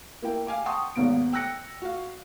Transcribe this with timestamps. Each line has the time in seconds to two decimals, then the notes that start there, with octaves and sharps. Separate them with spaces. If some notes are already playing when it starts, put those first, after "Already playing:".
0.22 A#3 E4 G5
0.47 F5 G#5 D6
0.65 F#5 G5 A5 C6 C#6 D#6
0.96 G#1 D#2 B2 B3 D7
1.33 G5 E6 F#6 A#6 C#7
1.82 F#4 F5